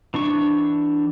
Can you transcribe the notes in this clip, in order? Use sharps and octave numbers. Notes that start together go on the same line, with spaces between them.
E3 D4 C#6